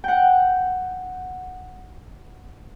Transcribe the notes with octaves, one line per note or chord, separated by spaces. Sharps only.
F#5 G5